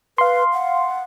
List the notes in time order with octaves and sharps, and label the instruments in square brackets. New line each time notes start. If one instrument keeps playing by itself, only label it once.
[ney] B4 [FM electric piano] F5 C6
[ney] F#5